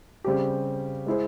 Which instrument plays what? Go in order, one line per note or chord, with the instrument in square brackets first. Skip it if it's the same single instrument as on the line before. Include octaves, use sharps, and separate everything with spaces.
[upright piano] C#3 G3 C4 G4
G#3 E4 G#4 C5